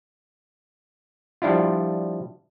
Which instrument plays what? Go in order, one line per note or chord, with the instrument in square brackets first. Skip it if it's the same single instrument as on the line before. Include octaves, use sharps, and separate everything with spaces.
[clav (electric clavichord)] F3 G3 D4 E4 F4